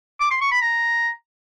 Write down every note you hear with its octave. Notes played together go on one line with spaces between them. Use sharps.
D6
C6
C#6
B5
A#5